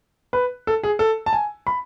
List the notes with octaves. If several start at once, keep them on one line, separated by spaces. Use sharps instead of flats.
B4
A4
G#4
A4
A5
G#5
B5